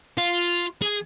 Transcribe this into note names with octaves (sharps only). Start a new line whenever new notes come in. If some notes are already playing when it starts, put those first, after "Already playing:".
F4
G#4